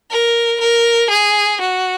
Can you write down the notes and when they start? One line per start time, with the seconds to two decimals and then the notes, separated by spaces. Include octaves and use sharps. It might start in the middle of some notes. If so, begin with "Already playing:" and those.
0.11 A#4
0.60 A#4
1.10 G#4
1.60 F#4